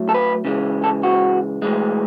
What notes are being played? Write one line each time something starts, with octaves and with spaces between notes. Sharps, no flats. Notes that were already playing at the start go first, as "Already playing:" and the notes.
Already playing: A2 F#3 A3
A4
B4
C#3 E3 G#3
A4
F#4
A2 E3 G#3